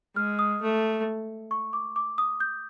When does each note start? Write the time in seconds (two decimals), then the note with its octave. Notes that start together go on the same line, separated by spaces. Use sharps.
0.15 G#3 F6
0.39 D#6
0.61 A3
1.51 C#6
1.73 D6
1.96 D6
2.18 D#6
2.40 G6